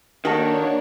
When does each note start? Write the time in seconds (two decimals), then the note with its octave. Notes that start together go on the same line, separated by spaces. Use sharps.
0.25 D#3 A#3 D4 F#4 A4 C#5